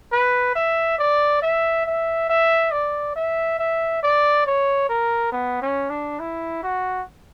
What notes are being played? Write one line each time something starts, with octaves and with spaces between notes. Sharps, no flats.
B4
E5
D5
E5
E5
E5
D5
E5
E5
D5
C#5
A#4
B3
C#4
D4
E4
F#4